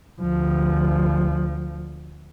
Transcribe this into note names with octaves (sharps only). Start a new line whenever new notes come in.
D2 F3